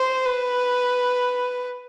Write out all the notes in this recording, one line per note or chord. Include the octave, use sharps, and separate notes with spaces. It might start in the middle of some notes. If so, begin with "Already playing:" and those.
Already playing: C5
B4